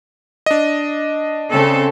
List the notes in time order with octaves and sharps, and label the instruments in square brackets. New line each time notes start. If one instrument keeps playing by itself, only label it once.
[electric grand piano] D4 D#5
[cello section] C#3 C4 A4